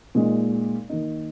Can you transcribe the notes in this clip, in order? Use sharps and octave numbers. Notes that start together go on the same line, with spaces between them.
A#2 G#3 D#4
D#3 A#3 D#4